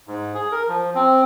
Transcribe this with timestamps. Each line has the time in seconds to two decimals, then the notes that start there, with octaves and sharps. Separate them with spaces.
0.07 G#2
0.35 G#4
0.52 A#4
0.68 F3
0.95 C4